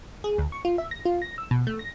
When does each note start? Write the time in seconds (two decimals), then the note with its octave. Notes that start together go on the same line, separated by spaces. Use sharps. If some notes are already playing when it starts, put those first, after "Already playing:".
0.24 G#4
0.38 D2
0.52 C#6
0.65 F4
0.78 E5
0.91 A#6
1.05 F4
1.22 A#6
1.38 E6
1.51 B2
1.67 A3
1.79 A#6